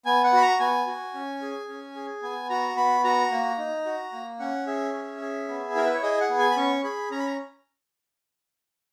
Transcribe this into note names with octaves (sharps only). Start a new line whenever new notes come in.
B3 G#5
F#5
F#4 B5
A#5
B3 G#5
F#4
C#4
G#4
C#4
G#4
B3 G#5
F#4 A#5
B3 B5
F#4 A#5
A#3
D#4
F#4
A#3
C#4 F#5
G#4 E5
C#4
G#4
B3
E4 A#4
B4
C#5
G#4 D#5
F#5
B3
G#5
B5
C#4 C#6
G#4 B5
C#4 A#5
B5
A#5